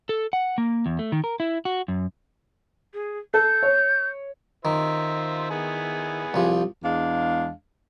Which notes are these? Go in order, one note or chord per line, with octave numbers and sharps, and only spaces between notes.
A4
F#5
A#3
E2
A3
D#3
A#4
E4
F#4
F#2
G#4
A4 G6
C#5
D#3 F4 C5 E5
B3 E4 G#4
C2 F3
E2 G#3 D4 F5